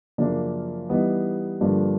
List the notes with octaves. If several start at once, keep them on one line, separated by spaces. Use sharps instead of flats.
F#2 C#3 F3 A#3 D4
E3 G3 B3 D#4
G2 D3 F3 A#3 D4